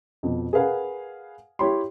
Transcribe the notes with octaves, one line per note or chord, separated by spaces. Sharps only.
F2 B2
G#4 A#4 B4 F5 F#5 G#5
E4 G4 C#5 G5 B5 C6